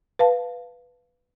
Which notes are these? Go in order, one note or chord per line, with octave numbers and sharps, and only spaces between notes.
B4 F5 A5